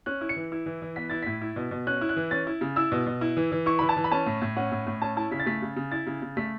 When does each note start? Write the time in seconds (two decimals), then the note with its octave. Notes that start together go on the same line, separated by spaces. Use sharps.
0.06 C#4 F#6
0.21 E4
0.29 C#7
0.36 E3
0.52 E4
0.66 E3
0.82 E3
0.96 B3 B6
1.10 E4 A6
1.22 A2 B6
1.41 E4
1.56 B2
1.71 B2
1.87 C#4 F#6
2.01 E4
2.09 F#6
2.16 E3
2.31 C#4 A6
2.47 E4
2.61 C#3
2.76 E4 E6
2.92 B2
3.06 B2
3.21 E4
3.37 E3
3.52 E3
3.66 E4 C#6
3.79 E3 B5
3.89 A5
3.97 E3
4.04 B5
4.11 C#4 A5
4.26 A2
4.42 A2
4.56 C#4 F#5
4.72 A2
4.87 A2
5.02 C#4 A5
5.17 E4 A5
5.31 C#3 B6
5.40 A6
5.46 A3 B6
5.62 C#3
5.77 C#3
5.92 E4 A6
6.07 C#3
6.22 C#3
6.37 A3 B6